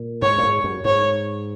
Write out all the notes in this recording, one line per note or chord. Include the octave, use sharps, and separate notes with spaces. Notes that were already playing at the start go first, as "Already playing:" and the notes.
Already playing: A#2
G#2 C#5
A#2
G#2
F#2
G#2 C#5